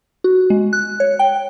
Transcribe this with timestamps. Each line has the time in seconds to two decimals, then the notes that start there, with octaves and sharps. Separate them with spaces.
0.24 F#4
0.50 G#3
0.73 F#6
1.00 C#5
1.19 G5